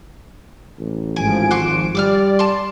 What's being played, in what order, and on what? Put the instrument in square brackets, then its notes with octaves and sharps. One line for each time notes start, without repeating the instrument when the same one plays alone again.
[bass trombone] A1
[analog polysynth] G#1 F3 D7 [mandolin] G#5
[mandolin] F#4 C6 D6
[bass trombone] G3 [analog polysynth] D5 [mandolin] D6 E6 F6
[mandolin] A5 C6